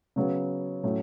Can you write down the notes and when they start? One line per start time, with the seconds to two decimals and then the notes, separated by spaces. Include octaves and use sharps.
0.16 C#3 F#3 B3
0.83 A2 F#3 C#4 E4